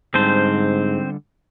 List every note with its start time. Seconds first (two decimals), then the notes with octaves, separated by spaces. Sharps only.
0.14 G#2 D3 G3 C4 C5 A5